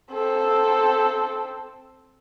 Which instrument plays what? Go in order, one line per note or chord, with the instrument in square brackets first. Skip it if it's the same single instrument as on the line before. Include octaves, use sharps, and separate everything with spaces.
[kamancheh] C4 A4